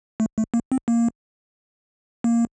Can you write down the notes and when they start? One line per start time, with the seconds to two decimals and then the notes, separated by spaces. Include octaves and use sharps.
0.20 A3
0.38 A3
0.54 A#3
0.72 C4
0.88 A#3
2.24 A#3